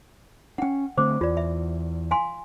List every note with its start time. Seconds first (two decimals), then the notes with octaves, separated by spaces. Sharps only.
0.58 C#4 D4 F#5 G5
0.97 D3 A3 C4 C5 D6
1.21 E2 F4 D5
1.37 E5
2.11 F5 G#5 C6